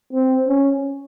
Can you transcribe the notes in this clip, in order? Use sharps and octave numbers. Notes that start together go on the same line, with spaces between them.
C4
C#4